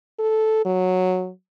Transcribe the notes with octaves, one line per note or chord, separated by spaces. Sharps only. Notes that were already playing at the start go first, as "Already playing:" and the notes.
A4
F#3